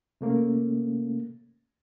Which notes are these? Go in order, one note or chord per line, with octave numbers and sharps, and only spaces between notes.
C3 A3 A#3 C#4